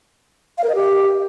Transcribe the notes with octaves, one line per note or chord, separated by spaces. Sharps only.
F5
A#4
D#5
G4